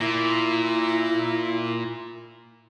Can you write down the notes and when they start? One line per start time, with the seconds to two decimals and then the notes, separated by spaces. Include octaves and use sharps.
0.01 A#2 E4